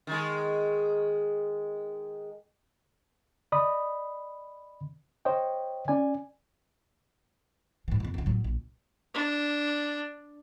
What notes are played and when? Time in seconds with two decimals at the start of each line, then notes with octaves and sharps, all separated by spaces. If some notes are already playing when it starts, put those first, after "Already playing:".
0.07 D#3 G#3
3.52 D5 D#5 B5 D#6
5.25 C5 C#5 D#5 G5
5.88 C#4 D5 G#5
7.88 G#2 E3
8.00 F2 C3
8.14 C#2 E3
8.26 A2 F#3
8.44 A#1
9.14 D4